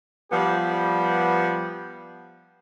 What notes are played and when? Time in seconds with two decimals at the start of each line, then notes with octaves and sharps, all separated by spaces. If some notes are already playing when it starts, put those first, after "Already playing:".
0.32 F3 G3 B3 G4